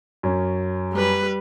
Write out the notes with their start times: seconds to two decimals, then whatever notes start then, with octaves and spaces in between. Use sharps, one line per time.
0.23 F#2 C#4
0.93 G3 B4